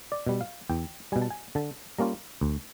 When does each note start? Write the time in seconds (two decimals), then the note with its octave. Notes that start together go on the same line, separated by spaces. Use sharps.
0.12 D5
0.27 B2 G3
0.41 F5
0.70 E2 G5
1.12 B2 G3 G#5
1.22 A5
1.30 G#5
1.55 D3 A5
1.98 G3 A#3 C#4 F4 A#5
2.41 D2